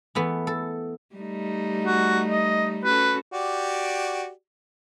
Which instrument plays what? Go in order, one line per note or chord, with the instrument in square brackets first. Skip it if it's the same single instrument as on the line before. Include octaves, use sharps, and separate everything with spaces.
[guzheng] E3 A3 B3
A4
[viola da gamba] G3 A3 D#4
[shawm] F#4
D#5
[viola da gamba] C#4 F#4 A4 [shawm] B4
[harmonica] F#4 G4 D5